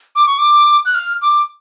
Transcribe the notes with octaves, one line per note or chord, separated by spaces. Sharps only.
D6
C#6
D6
F#6
F6
D6